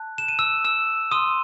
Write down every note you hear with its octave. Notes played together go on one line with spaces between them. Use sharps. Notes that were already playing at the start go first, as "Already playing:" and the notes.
Already playing: A5 F#6
E7
D#7
E6 E7
E6 E7
C6 D#6 E6 D#7